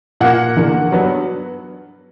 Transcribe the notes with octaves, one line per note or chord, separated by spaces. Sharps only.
A#2 A#3 F#5
E2 D3 A#3
G2 F#3 B3